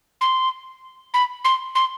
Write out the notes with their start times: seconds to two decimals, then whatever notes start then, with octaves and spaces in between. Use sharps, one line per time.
0.21 C6
1.14 B5
1.44 C6
1.75 C6